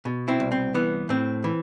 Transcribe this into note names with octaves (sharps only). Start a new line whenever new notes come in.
B2
C4 E4
C2
C4
E3 B3
A2 C4
E3